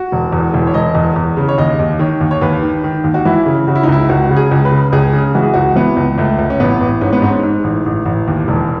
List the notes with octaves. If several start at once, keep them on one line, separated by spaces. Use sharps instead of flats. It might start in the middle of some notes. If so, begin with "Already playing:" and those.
Already playing: F#4
E1
E2
E1
C#5
E1 D#5
E2
E2
C#3
C#5
D#2 D#5
D#2
D#3 C#5
D#2
C#5
D#2 B4
D#3
D#3
D#2
F#4
E3 E4
C#3
C#3 F#4
E4
D#4
C#2 E4
C#2 F#4
C#3 F#4
G#4
C#2
B4
C#3
C#2 G#4
C#3
E3 F#4
G#4
C#2 F#4
E3 B3
C#2
C#2 A3
C#2
C#4
A1 B3
A1
G#2 C#4
B3
G#2 C#4
G#2
A1
A1
A1
D#2
E1